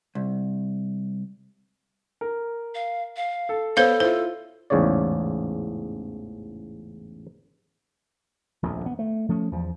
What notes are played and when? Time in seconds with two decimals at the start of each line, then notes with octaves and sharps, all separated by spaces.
0.15 C2
2.21 A#4
2.75 F5
3.16 F5
3.49 A4
3.77 B3 A4 C5 C#5 F5
4.00 E4 F4 C5
4.70 A1 E2 G#2 C#3 C#5 D5
8.62 D#1 A#1 F2 A2
8.86 B3
8.99 A3
9.29 F3 A3 C#4
9.52 E2 F3